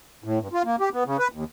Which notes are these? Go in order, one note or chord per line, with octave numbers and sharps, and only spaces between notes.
A2
G2
F4
A#3
G4
B3
C#3
B4
D#2